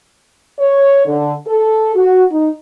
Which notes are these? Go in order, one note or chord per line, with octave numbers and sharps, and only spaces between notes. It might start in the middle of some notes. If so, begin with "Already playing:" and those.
C#5
D3
A4
F#4
D#4